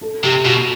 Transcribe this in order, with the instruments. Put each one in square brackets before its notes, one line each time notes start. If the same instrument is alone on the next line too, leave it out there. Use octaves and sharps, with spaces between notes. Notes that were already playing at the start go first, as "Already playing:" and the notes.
[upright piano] A4
[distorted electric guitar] C3 [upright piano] G4
[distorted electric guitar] B2 [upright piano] F#4